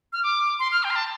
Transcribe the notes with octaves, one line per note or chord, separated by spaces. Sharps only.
F6
D6
C6
F6
G5
C6
A5